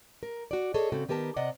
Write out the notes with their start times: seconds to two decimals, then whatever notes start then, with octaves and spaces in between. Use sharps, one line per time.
0.23 A#4
0.51 F#4 D5
0.74 G#4 A4 C#5 D#5
0.92 C#3 C4 F#4 A4
1.08 D#3 B3 G4 A#4 A5
1.36 C3 D5 D#5 F#5